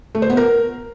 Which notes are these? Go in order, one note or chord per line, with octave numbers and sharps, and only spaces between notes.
A3
C5
B3
A#4